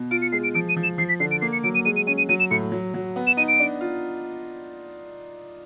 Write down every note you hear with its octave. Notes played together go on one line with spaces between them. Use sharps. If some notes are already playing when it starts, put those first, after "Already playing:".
Already playing: B2
F4 D7
C#7
G#3 C7
D7
F3 D7
D#7
F3
E7
F3 C7
B6
D3 C7
D7
A#3 C7
C#7
F#3 D7
D#7
G#3 D#7
D#7
C#4 D#7
D#7
F#3 D#7
E7
A2 C#7
F#3
F#3
B3
E7
D#4 D#7
D7
D4
F4